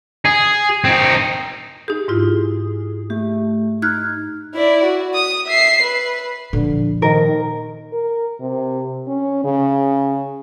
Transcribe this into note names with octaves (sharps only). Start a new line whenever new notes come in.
G#4
C4 D#4
D#4 G4 G#4
G#2 E4 F4
A3 G4
D#4 F6 F#6 G#6
E4 D5
F#4
D#6
E5 C7
B4
A#2 D3 F3
D#3 A#4
A#4
C3
C#4
C#3